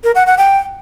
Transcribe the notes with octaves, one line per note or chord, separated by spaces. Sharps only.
A#4
F#5
F#5
G5